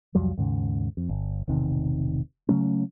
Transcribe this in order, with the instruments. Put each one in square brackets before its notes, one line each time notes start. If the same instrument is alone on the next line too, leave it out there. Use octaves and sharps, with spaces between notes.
[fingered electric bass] C2 F2 F#3 G3
D#2 G#2 C#3
F2
G1
E1 A1 C3 D#3
C#3 F#3 A3 C#4